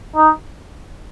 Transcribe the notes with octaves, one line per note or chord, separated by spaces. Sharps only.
D#4